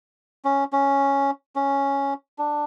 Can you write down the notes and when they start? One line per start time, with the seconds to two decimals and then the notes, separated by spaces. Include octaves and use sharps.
0.45 C#4
0.73 C#4
1.56 C#4
2.39 D4